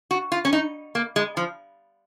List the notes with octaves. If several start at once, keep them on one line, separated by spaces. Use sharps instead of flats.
F#4
F4
C#4
D#4
A#3
G#3
F3